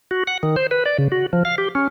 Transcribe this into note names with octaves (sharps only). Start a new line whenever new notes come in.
F#4
F#5
D#3
C5
B4
D5
C#3
F#4
F3
F5
G4
C#4